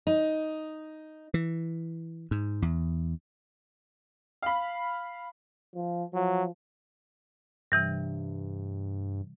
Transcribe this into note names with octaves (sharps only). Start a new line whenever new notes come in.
D#4
E3
G#2
E2
F5 B5
F3
F3 F#3
G2 C3 E3 G3